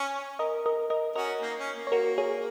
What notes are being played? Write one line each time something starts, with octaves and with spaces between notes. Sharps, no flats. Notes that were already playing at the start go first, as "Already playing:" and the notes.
Already playing: C#4
A#4 D#5
A#4 D#5
A#4 D#5
C#4 F#4 A#4 D#5
A#3 D#4
C#4
A#3
C#5
F#4 A#4
G#4 C#5